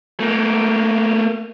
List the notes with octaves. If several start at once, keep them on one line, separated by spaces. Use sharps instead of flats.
A3 A#3